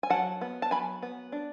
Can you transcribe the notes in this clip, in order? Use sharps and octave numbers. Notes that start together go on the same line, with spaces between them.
G#5
F#3 F#5 A5
B3
A5
F#3 G#5 B5
B3
D4